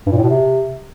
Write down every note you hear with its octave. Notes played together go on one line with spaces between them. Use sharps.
G2
A#2
A2
B2
C3